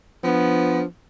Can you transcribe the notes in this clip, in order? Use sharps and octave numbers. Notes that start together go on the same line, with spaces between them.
F3 B3 D4